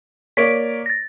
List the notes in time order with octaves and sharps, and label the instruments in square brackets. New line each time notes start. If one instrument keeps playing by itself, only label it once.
[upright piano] A#3 C#5 D5 [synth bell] B6 D7
[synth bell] A6 A#6